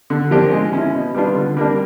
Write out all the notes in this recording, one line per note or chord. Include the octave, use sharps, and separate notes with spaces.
D3
F3 A#3 D4 G4
G#3
C#4 E4
B2
G3 B3 D4 F4
D3
G3 A#3 D4